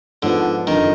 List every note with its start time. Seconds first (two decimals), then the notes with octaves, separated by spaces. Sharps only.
0.23 G#2 D3 F3 B3
0.67 F#1 F2 D3 D#3